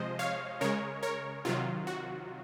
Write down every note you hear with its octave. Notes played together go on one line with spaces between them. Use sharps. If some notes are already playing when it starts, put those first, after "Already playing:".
Already playing: C3 F3 G#3 C5 D#5
C#5 F5
C#3 G#3 A#4 C#5
A#4 C#5
C3 D#3 F#3 F4
F#4